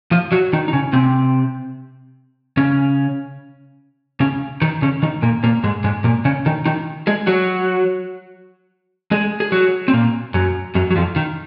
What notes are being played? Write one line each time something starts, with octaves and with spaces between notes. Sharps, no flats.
F3 F4
F#3 F#4
D#3 D#4
D#4
C#3 C#4
C3 C4
C#3 C#4
C#3 C#4
D#3 D#4
C#3 C#4
D#3 D#4
A#2 A#3
A#2 A#3
G#2 G#3
G#2 G#3
A#2 A#3
C#3 C#4
D#3 D#4
D#3 D#4
G#3 G#4
F#3 F#4
G#3 G#4
G#4
F#3 F#4
C4
A#2 A#3
F#2 F#3
F#2 F#3
F#3
F2 F3
D#3